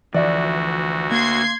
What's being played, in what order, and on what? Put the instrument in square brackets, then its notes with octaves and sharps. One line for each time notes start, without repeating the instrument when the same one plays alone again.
[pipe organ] D2 F#4 [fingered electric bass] E3 F3 [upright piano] D5 E5
[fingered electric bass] A#3 [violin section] C6 G#6 C7